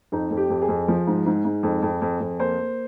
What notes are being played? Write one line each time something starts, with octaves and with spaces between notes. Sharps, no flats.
F2 D#4
F2
G4
F2
G#4
F2
F3
G#2
G#2
G#2
F2
F2
F2
F2
A#3 C5
A#3